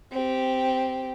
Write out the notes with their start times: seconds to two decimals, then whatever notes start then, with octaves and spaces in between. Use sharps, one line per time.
0.12 C4 G4